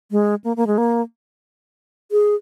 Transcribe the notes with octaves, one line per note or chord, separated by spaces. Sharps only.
G#3
A#3
A#3
G#3
A#3
G#4